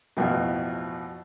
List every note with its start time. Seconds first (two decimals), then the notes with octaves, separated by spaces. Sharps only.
0.17 A1 F2 B2